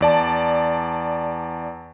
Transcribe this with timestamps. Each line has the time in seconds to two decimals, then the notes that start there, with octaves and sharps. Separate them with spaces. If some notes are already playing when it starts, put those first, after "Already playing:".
0.01 E2 D5 A5